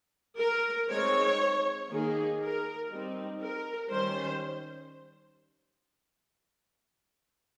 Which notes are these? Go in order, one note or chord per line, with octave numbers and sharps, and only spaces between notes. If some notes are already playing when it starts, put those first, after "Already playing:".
A#4
G#3 C4 D#4 C#5
D#3 A#3 D#4 G#4
A#4
G3 C4 D#4
A#4
D#3 G3 C#4 C5